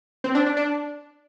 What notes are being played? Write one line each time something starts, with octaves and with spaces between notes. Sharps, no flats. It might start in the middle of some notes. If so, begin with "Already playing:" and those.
C4
D4
D4
D4